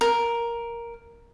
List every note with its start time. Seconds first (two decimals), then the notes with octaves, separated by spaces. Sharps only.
0.01 A#4